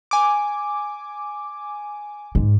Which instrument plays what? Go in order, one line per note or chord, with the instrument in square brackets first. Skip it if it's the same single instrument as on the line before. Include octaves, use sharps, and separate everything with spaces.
[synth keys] G#5 D6
[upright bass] G#2